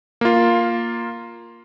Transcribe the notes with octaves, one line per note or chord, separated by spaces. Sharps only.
A#3 F4